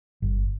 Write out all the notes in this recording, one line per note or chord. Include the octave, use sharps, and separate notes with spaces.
G1